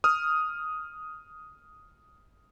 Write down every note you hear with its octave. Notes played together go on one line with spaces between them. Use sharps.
D#6 F6